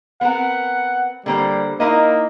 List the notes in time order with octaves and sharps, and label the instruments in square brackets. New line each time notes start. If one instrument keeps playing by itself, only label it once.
[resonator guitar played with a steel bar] B3 C4 A#4 [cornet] F#5
[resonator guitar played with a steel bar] D3 A#3 C5 [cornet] G3
[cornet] A#3 [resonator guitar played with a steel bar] D#4 E4 D#5